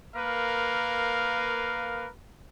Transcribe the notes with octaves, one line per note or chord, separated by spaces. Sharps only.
A#3 A#4 B4 F5